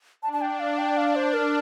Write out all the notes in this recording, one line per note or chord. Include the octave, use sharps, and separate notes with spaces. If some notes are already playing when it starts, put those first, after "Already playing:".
D4 A5
A5
G5
F5
G5
D4 F5
C5
A#4